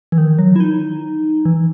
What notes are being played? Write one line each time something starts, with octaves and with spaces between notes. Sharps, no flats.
E3
D#3
F#3
E4
D#4
E3